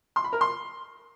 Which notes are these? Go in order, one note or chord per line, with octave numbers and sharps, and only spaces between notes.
C6
B5
A#4
C6